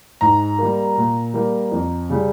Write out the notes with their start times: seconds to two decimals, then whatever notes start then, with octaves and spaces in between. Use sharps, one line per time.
0.21 G#2 A#5
0.59 G3 A#3
0.97 A#2
1.34 G3 A#3
1.71 F2
2.10 C#3 G3